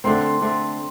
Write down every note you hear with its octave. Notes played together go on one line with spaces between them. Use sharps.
D3 A3 C4 C6
D3 A3 C4